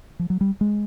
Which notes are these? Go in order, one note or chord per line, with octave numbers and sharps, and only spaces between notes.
F3
F#3
G3
G#3